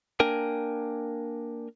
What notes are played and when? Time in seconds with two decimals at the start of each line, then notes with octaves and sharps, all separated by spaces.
0.20 A#3 D4 A#4 G5 G#5